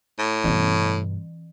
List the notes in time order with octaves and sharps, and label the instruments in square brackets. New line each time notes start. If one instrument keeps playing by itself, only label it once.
[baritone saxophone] A2
[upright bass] G2 B2 [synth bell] E3